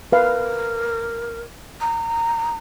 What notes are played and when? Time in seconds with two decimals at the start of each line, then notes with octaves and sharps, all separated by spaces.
0.12 A#4 B4 F5
1.81 A#5